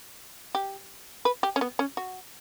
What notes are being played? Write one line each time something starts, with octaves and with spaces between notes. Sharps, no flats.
G4
B4
G4
C#4
B3
C#4
F#4